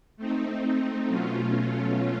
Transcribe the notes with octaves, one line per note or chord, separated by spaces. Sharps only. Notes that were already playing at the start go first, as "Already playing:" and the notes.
A3 C4 D#4
B2 F#3 A3 C#4 F4